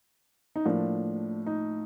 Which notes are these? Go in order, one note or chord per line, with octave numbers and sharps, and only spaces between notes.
D#4
A2 F3 A#3 D4
D#4